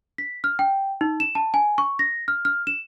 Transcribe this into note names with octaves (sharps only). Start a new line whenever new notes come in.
B6
F6
G5
D#4
E7
A5
G#5
C#6
A#6
F6
F6
E7